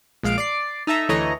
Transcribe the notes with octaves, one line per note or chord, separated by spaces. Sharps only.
A#1 G#3 F5 D7
D5 D6 C7
D#4 A4 E5 A#5
D2 E3 A3 C#5 D#5 A#5